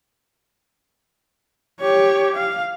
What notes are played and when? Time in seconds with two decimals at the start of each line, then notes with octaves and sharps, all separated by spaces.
1.81 G4 C#5
2.36 F5